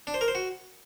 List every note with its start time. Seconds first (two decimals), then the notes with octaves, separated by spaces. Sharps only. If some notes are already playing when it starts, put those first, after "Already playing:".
0.07 D4
0.14 C5
0.21 A#4
0.28 C5
0.35 F#4